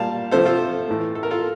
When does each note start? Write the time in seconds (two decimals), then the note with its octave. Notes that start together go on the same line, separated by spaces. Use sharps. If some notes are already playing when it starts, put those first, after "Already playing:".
Already playing: A#2 G3 A#3 F5 A5
0.31 C3 F3 A3 A4 C5
0.46 F4 A4
0.87 A2 E3 A3
1.15 A4
1.23 A#4
1.31 F4 A4